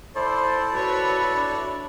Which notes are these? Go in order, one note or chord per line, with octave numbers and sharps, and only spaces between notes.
E4 A4 C5 D5
F#4 B4 C#5
D4